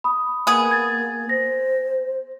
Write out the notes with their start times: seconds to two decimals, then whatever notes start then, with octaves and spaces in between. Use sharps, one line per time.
0.04 B5 D#6
0.47 A#3 B3 G#4
0.71 G#6 A6
1.29 C5 A#6